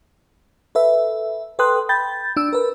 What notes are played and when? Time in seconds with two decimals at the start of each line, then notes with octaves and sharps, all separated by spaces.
0.75 A4 B4 E5
1.59 A4 B4 G5 C6 D#6 F#6
1.89 G5 B5 G6 A6
2.37 D4 E6
2.53 A#4 B4